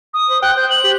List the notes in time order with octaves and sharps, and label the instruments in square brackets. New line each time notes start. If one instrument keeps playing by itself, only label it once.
[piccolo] D#6
[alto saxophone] C5
[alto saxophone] G5 [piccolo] F#6
[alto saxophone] C5 [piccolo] G6
[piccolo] F#7
[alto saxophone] G4